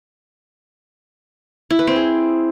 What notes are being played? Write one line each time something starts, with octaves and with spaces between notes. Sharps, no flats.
E4
B4
C4
G#4